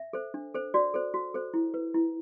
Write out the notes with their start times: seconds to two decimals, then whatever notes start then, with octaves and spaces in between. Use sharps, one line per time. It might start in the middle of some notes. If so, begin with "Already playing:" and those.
Already playing: E5
0.13 A4 C5
0.34 D4
0.54 A4 C5
0.74 F#4 D5
0.94 A4 C5
1.14 F#4
1.34 A4 C5
1.54 E4
1.74 B4
1.94 E4